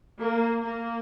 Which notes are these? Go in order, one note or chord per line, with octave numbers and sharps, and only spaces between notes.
A#3
A#3